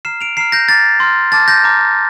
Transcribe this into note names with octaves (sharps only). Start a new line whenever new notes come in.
A#5 F6 C7 E7
D7 F7
A#5 F6 C7 E7
G6 A#6
A#5 D6 F6 A6
C6 F6
A5 D6 F6 A6
G6 A#6
A#5 D6 F6